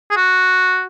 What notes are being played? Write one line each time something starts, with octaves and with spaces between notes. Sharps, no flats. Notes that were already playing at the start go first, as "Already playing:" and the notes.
G#4
F#4